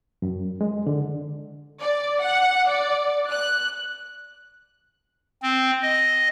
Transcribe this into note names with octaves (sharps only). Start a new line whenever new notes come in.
F#2
G#3
D3
D5
F#5
D5
F#6
C4
D#5